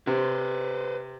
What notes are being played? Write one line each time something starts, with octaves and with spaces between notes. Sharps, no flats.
C3 B4 C5